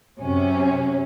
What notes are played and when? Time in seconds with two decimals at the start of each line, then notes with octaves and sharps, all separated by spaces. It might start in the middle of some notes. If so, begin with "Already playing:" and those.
0.21 F#2 C3 C#4